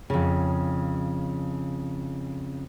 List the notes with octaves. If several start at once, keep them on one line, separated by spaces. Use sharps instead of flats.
F2 C#3